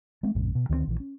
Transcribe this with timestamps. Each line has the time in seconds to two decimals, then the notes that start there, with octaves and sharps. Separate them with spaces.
0.23 G#3 A3 C4
0.35 A#1 F2 G#2 C#3
0.55 B2
0.69 D2 D#3 A3 C4
0.87 A#1 E3
1.00 C#4